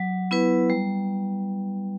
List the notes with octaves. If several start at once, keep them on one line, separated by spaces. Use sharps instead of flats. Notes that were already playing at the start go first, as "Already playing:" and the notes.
Already playing: F#3
B3 E4 B4
G3